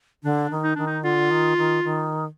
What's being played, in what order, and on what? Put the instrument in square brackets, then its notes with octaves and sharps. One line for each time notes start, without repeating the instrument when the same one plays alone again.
[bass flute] D3 [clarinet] D4
[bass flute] D#3
[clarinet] D#4
[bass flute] D#3 [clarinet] D4
[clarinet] D#4
[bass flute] D3 [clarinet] F4
[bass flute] D#3
D#3
D#3